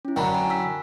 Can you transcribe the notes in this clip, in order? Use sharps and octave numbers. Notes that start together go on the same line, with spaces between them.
C#4 E4
F#2 D3 G5 A#5 B5
G#5
E6 B6